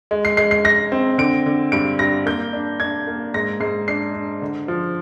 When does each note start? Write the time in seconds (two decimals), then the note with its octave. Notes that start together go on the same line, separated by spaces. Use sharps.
0.11 G#3
0.25 C7
0.37 G#3 C7
0.51 C7
0.64 D#4 A#6
0.92 C4
1.18 D3 D7
1.46 D3
1.72 G2 D7
1.99 G2 A#6
2.26 A#3 G6
2.53 D4
2.80 D4 G#6
3.07 A#3
3.34 G#2 A#6
3.60 G#2 C7
3.88 D4 C7
4.14 D4
4.42 D3
4.68 F3